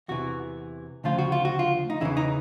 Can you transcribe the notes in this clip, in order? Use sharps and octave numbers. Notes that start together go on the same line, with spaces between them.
E2 C3 E3 F#4
D2 C#3 F3 F4
F#4
F4
F#4
F4
D#4
E2 C#3 E3 E4
D#4